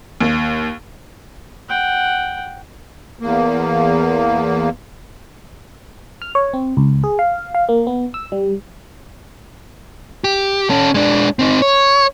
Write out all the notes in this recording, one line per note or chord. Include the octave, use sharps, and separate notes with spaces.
D#2
F#5 G5
E2 A#3
F6
C#5
C4
C#2
G#4
F5
F5
A#3
B3
E6
G3
G4
C#4 A4
G#3 D4
C4 D#4
C#5